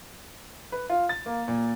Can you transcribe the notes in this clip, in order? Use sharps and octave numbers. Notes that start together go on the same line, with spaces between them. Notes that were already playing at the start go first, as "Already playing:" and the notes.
B4
F4
A6
A#3
A#2